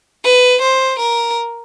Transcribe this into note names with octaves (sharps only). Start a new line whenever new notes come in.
B4
C5
A#4